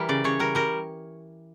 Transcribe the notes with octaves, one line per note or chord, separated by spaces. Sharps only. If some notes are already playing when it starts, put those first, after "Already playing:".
Already playing: E3 G3 A#4
C#3 D5
C#3 C#5
G3 A#4
G3 A#4